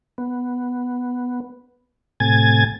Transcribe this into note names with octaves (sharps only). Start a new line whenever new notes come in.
B3
A2 C3 G#5 G#6 A6